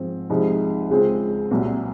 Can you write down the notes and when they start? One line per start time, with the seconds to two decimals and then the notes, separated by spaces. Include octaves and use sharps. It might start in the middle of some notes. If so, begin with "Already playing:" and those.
Already playing: G#2 F3 C4
0.29 C2 C3 F3 G#3 D#4
0.90 C#2 C#3 G#3 C4 F4
1.51 C2 A#2 F#3